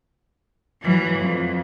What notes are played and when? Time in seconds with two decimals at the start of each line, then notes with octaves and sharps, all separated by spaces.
0.81 E3 F#3
1.19 F2